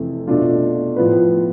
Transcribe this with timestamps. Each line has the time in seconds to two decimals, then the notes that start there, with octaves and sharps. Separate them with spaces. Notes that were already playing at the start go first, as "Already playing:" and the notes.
Already playing: F2 C3 E3 A3
0.27 B2 A3 D4 F4
0.96 A2 F3 B3 F4 B4